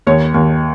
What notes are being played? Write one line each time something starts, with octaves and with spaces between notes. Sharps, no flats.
D#2 C#5
D#2